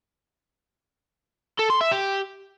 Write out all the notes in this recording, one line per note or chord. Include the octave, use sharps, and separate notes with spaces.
A4
C6
E5
G4